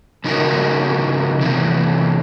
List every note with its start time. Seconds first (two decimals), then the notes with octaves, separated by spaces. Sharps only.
0.24 C#3 F3 D#4 F#4 A#4
1.41 E2 C3 E3